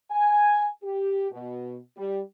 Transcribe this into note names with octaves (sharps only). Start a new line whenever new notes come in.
G#5
G4
B2
G3